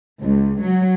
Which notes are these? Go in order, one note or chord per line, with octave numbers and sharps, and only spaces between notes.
C#2
F#3